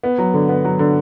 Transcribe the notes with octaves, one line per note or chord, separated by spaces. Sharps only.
B3
F#3
D3
B3
F#3
D3